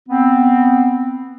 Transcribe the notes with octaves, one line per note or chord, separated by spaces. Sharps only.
B3 C4